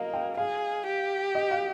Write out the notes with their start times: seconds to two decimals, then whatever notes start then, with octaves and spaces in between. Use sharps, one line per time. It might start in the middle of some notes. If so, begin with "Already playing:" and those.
Already playing: A#3 D#5 F5
0.13 G5
0.37 G#4 F5
0.86 G4
1.35 D#5
1.51 F5